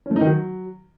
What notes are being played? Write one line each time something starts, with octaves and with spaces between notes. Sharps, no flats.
C#4
A3
D#4
D#3
F#3